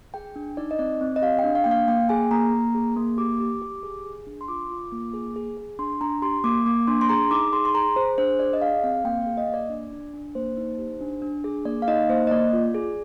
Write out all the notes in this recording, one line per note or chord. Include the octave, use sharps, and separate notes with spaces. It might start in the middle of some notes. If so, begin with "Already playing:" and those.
G#4 G5
D4
D#4 D5
D#5
C4 D5
C4
D#5
G4 F5
G5
D4
F5
A#3 G5
F5
A#3 G5
G#4 G#5
A#3 A#5
A#3
G#4
A#3
G4 D6
G4
G4
G#4
G#4
D4
C6
F4 D6
F4
A#3
G#4
G#4
G#4
D4 C6
D4 A#5
G4 C6
A#3 D6
A#3 D6
D4 C6
C6
G#4 A#5
D#4 D6
G#4 C6
C6
G#4 A#5
G#4 C5
D4 C5
G#4 D5
D#5
G#4 F5
C4 F5
A#3 G5
F5
G#4
D#5
A#3
D5
D4
D4
D4
A#3 C5
D#4
G4
D4
D4
G#4
A#3 D5
F5
D#4 D#5
A#3 C5
D#5
A#3 D5
F4
G#4